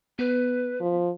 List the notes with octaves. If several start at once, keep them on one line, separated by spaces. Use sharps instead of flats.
B3 B4
F3